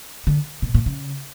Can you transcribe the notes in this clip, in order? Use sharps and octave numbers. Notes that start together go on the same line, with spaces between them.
D3
B2
A#2
C#3